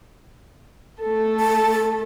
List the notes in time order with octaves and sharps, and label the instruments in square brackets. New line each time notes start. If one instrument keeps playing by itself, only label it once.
[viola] A3 A4
[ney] A5